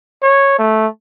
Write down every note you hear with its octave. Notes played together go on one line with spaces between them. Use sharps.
C#5
A3